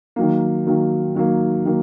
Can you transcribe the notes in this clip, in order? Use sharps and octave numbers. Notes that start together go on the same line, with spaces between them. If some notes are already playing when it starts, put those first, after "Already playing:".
D#3 F#3 A#3
D#3 F#3 A#3
D#3 F#3 A#3
D#3 F#3 A#3